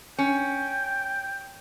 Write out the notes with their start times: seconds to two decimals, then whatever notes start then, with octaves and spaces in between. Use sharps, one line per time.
0.18 C#4 G5